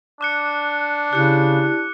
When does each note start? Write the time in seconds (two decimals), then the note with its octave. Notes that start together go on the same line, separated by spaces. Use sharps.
0.21 D4 D6 F#6 C#7
1.13 C#3 E4 G4 F#6 C#7